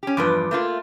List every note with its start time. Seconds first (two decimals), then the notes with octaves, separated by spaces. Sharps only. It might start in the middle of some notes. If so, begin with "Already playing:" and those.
0.03 C#4 G4
0.17 E2 G2 F3 B4 D6
0.51 A3 A#3 F4